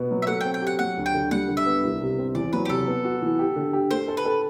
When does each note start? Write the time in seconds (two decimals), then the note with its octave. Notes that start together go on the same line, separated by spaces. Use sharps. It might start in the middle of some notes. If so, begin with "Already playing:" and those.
Already playing: B2 B3
0.11 F#3
0.22 E5
0.27 A3 F#5
0.41 C4 G5
0.54 G5
0.62 G4 F#5
0.79 F#3 F#5
0.97 D2
1.06 G5
1.14 D3
1.31 G3 F#5
1.48 D3
1.57 E5
1.66 B3
1.83 C2
2.01 C3
2.18 C4
2.35 E2 D5
2.53 F#3 B4
2.65 G4
2.69 C3 A4
2.87 B3
3.04 F#4
3.22 E3
3.39 G4
3.56 D3
3.73 G4
3.91 A3 C5
4.08 A4
4.17 B4
4.25 A4